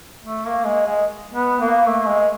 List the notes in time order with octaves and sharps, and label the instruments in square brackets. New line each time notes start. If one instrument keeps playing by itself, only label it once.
[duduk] A3
A#3
G#3
G#3
B3
A#3
A3
G#3